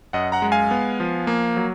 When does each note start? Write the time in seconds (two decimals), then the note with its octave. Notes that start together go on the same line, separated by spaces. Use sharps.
0.13 F#2 D#5 F#5
0.32 F#5 A#5
0.42 G#3
0.52 F5 G#5
0.71 B3
1.00 F3
1.27 A#3
1.57 F#3